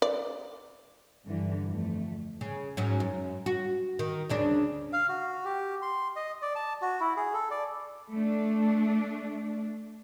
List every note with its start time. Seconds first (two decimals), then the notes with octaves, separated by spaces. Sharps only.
0.02 D5
1.25 G2 D3 E3
1.69 F2 A3
2.41 C#3
2.77 G#2 F#3 C#4
3.00 F#2
3.46 F#4
3.99 D#3
4.29 D2 C#3 D4
4.93 F5
5.09 F#4
5.45 G4
5.82 C6
6.16 D#5
6.42 D5
6.56 A5
6.82 F#4
7.00 E4
7.17 G#4
7.34 A4
7.51 D5
8.13 A3 D4